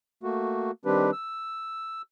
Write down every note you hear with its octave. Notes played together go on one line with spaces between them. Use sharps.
A3 A#3 F#4
D#3 G3 C4 D4 G4 B4
E6